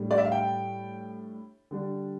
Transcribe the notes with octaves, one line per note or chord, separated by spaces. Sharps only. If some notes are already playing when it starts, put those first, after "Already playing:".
Already playing: A2 G3 D4
D5
E5
F5
G5
D3 G3 D4